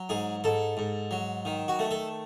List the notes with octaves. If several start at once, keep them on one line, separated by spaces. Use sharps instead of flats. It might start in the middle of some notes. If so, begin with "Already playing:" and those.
Already playing: F#3
G#2 G#4
G#2 A4
G#2
F#3
D#3
F#4
A3
A4